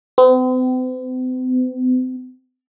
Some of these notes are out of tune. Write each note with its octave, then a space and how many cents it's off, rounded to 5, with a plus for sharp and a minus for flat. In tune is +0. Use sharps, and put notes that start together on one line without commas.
C4 -45